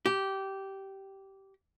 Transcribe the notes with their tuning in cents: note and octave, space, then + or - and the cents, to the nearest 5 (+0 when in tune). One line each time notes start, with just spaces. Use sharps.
G4 -15